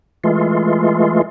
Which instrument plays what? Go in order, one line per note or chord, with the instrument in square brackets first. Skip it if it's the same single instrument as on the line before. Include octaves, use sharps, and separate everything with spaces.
[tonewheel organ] E3 G#3 A3 F4